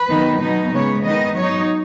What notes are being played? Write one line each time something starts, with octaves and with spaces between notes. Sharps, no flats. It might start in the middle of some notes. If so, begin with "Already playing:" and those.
Already playing: B4
D#3 F#3 B3 D#4
B2 F#3 B3 D#4
C#3 G#3 B3 C#5
D#3 B3 D#4 D#5
F#3 D#4 C#5